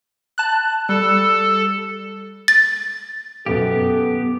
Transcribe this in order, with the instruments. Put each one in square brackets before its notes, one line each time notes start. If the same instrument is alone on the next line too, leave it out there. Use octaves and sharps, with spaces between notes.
[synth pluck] A5 F#6
[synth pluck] G3 [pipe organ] A4
[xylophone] A6
[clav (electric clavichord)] F#2 B2 F5 [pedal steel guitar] B3 G4 [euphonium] A4